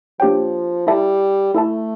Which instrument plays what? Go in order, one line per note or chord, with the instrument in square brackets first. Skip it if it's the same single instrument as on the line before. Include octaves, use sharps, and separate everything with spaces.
[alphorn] F3 [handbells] A#3 D4 G4 C#5 G5
[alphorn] G3 [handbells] E4 A4 E5 A5
[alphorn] A3 [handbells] E4 A4 E5 A5